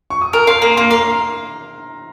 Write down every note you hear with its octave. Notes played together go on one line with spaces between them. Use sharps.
C#6
D#6
A#4 F6
F5 C6
A#3
A#3 C6
F5 A#5